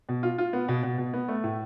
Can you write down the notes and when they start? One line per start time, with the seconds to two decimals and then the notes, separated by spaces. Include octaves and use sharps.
0.09 B2
0.23 F4
0.38 F4
0.53 B3
0.68 B2
0.83 B2
0.98 B2
1.14 B3
1.28 A3
1.44 A2